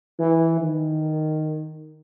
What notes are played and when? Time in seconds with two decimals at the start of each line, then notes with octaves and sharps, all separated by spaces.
0.19 E3
0.60 D#3